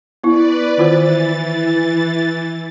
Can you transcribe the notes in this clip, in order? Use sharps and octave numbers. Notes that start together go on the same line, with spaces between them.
B3 E4 B4 D5
D#3 E3 F4 C5 A6